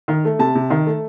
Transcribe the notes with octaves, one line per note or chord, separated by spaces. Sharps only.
D#3
A3
C3 A5
C3
D#3
A3